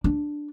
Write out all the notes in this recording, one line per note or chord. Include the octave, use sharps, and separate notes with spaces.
D4